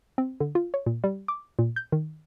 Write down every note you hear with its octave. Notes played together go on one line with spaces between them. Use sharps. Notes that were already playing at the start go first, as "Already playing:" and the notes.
C4
D3
F4
C#5
A#2
G3
D6
A#2
G6
D#3